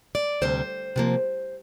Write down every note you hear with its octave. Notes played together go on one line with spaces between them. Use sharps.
D5
D2 C3 G3 C5
C3 F3 A#3